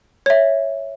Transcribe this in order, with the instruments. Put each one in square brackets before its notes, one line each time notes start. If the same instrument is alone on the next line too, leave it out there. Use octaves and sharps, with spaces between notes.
[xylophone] C#5 E5